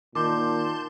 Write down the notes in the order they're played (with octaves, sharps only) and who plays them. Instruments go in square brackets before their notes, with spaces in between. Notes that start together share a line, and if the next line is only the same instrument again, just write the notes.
[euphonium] A#2 [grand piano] D#3 [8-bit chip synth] A5 C6 G6 [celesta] D6